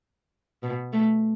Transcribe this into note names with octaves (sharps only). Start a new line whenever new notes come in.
B2
A3